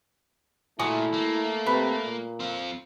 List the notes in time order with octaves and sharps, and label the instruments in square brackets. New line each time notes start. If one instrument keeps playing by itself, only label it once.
[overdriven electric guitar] A#2 [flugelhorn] A3 [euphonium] E4 [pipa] F#4 G#4
[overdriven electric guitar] A#3
[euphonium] C3 [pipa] B4
[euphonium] A#2
[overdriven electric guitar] C4 F4